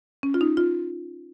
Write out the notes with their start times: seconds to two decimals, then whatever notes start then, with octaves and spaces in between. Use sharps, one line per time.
0.23 C#4
0.34 F4
0.41 D#4
0.57 F4